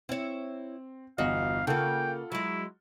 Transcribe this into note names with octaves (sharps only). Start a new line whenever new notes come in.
C4 E4 C#5
G1 E2 F#4 D#5 F5
C#3 A#3 F4 A4 F#5 G5
F#3 G#3 E4